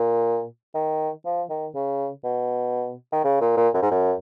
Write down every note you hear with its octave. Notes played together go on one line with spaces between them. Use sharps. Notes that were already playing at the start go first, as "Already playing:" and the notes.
Already playing: A#2
D#3
F3
D#3
C#3
B2
D#3
C#3
A#2
A#2
F#2
G#2
F#2